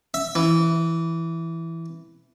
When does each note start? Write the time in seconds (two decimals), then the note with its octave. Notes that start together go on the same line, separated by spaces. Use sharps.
0.14 E5
0.35 E3